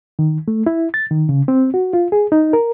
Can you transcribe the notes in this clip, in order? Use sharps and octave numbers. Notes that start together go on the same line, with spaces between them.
D#3
A3
E4
A6
D#3
C#3
C4
F#4
F4
G#4
D#4
A#4